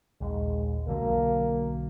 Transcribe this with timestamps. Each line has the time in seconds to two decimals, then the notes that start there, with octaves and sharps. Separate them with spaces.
0.21 A#1 D#2 G#3
0.87 B1 D3 F#3 A#3